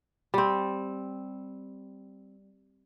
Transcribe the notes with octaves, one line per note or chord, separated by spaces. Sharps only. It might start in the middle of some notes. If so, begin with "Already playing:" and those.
G3 C4